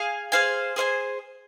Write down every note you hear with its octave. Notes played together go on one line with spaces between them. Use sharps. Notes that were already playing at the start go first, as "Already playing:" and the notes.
Already playing: G#4 F5 G#5
G#4 C5 F5 G#5
G#4 C5 F5 G#5